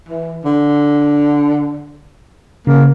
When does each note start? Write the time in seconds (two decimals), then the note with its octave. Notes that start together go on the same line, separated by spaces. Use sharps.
0.09 E3
0.44 D3
2.67 C#3 A#3